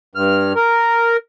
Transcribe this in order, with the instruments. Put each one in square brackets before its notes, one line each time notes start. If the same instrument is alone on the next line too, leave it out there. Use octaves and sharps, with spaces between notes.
[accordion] G2 F6
A#4